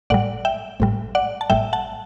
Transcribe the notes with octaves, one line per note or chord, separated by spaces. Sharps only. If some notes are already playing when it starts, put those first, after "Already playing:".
A1 A2 G3 D5 F#5
E5 G5
A1 A2 G3
D5 F#5
A5
A1 A2 G3 E5 G5
F#5 A5